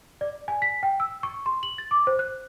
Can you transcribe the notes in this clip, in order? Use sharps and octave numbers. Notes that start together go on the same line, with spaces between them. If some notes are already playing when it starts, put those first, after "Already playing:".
D5
G#5
B6
G5
E6
C#6
C6
F#7
A6
D6
C5
F#6